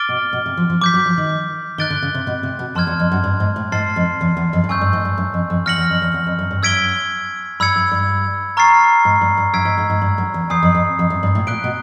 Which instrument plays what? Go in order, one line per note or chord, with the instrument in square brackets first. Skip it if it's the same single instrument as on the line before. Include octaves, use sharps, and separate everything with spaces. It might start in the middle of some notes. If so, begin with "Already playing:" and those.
Already playing: [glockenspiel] D6 F6 A6 D7 G7
[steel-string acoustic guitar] B2
B2
C3
F3
F3
[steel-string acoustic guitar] F3 [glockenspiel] D6 G6 B6
[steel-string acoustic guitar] F#3
F3
D#3
[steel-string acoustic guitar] D#3 [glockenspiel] F#6 A6 D7 G7
[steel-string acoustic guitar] D3
C#3
C3
B2
C3
B2
[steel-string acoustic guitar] F2 [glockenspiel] A5 C6 F6 G#6
[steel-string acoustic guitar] E2
F2
F#2
G2
G#2
A2
[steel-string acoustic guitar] G#2 [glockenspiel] A5 C6 F6 A6 C7
[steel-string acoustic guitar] F2
E2
E2
F2
G2
[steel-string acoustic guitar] F#2 [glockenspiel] G#5 C#6 E6 G6
[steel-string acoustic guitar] G2
G#2
G2
F#2
F2
F2
[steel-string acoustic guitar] E2 [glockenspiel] F6 A#6 C#7 F#7
[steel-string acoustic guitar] E2
F2
E2
E2
F2
F#2
G2
[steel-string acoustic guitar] F#2 [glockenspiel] E6 G#6 B6 D7 G7
[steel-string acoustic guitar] G2 [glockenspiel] B5 E6 G#6 C#7
[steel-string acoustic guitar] F#2
G2
[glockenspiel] A#5 C#6 F6 A6 C7
[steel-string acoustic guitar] G#2
G2
G2
[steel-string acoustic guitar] F#2 [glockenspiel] E6 G#6 B6 D7
[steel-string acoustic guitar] G#2
G#2
G#2
G2
F#2
E2
[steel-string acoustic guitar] E2 [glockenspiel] G#5 B5 D#6 G6 C7
[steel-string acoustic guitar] F2
F2
F2
F#2
G2
A2
[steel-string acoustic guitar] A#2 [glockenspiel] F#6 B6 D7 G7
[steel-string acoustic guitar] B2